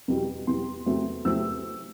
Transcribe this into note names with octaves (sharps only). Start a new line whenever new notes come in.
E2 B2 G3
E2 B2 G3 C6
E2 C3 F#3 A3 C4
E2 C3 F#3 A3 C4 E6